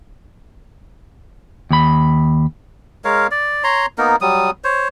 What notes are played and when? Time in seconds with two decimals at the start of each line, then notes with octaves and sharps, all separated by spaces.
1.71 D#2 B5
3.05 G#3 A#4 C#5 F5
3.31 D5
3.64 C#5 A#5 C6
3.98 A#3 B3 D#4 A#4
4.21 F#3 G3 D#6
4.64 C5 C#5